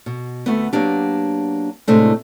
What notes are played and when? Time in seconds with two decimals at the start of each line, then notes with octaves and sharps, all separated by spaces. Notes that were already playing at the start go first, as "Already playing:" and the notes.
0.06 B2
0.46 D2 A3 B3
0.73 F#3 A#3 B3 D4 G4
1.88 A2 C3 G#3 A3 D4